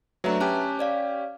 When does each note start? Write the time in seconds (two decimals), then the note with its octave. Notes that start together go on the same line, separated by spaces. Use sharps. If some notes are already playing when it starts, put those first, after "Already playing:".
0.24 F#3 A3 D4 B4 E5 A#5
0.40 C#4 G4 G#5 A5 F#6
0.79 C#5 D5 F5